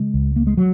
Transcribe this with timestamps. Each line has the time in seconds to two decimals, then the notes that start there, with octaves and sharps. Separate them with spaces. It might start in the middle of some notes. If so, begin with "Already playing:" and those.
Already playing: C#3 G#3
0.14 C#2
0.36 A#3
0.47 G#3
0.57 F#3